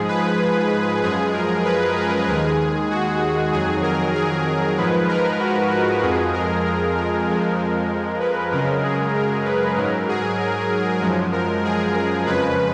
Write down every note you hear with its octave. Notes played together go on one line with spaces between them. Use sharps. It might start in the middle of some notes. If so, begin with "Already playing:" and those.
Already playing: G#2 F3 G#3 G#4
B4
F#2 F3 G#3 G#4
A#4
B4
A#4
D#2 D#3 G#3 G#4
F#4
F2 D#3 F#3 G#4
A#4
G#4
G#2 F3 G#3 B4
A#4
F#4
F#4
F2 F3 G#3 G#4
A#4
A#4
A#4
F2 F3 G#3 A#4
B4
F#2 C#3 G#3 A#4
G#4
A#4
B4
G#2 F#3 A#4
G#4
A#4
F#2 F3 G#3
A#4
G#4
A#4
F2 C#3 F3 G#3 B4